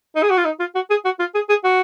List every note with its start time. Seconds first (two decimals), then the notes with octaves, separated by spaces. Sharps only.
0.16 D#4
0.23 G#4
0.30 F#4
0.38 F4
0.45 D#4
0.60 F4
0.75 F#4
0.90 G#4
1.05 F#4
1.19 F4
1.35 G#4
1.49 G#4
1.64 F#4